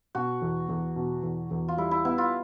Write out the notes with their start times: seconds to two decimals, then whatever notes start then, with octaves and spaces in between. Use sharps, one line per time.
0.15 B2 F#4
0.42 E2
0.69 E2
0.96 B2
1.23 E2
1.51 E2
1.68 F4
1.77 G3 E4
1.91 E4
2.05 B3 E4
2.18 F4